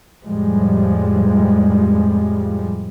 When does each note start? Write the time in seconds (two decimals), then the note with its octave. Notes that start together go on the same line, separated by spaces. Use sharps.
0.25 F2 A2 F3 G3 G#3